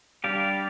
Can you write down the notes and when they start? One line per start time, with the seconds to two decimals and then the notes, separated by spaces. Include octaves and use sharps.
0.24 G3 D4 G4 D5 F5